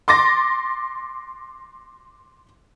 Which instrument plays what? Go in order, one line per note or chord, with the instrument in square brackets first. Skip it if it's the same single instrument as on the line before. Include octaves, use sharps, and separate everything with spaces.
[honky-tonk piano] C6 D6 A6 A#6